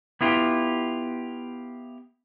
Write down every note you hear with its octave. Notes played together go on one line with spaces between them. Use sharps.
B3 E4 F4 G4